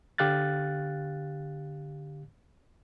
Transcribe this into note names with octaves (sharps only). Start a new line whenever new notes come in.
D3 G4 F5 F#6 A6